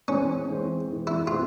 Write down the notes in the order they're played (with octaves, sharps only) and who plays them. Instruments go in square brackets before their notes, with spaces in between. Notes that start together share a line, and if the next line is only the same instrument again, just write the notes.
[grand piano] E3 G#3 C4 [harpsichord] C#4
[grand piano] E3 G#3 C4
E3 G#3 C4
[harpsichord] E4
[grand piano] E3 G#3 C4 [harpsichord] F4